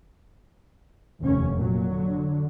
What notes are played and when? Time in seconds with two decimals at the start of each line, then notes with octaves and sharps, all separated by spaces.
1.20 F1 D#2 C#4
1.58 A#2 F#3
1.91 D3